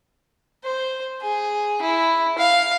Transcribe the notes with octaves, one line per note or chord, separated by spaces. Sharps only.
C5
G#4
E4
F5